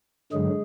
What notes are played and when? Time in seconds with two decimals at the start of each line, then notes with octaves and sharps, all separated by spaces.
0.32 G2 D3 F#3 G#3 G#4